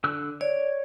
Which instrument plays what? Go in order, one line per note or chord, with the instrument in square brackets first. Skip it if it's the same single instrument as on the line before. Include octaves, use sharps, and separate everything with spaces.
[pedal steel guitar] D3 E6 F#6
[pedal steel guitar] C#5 [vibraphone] D5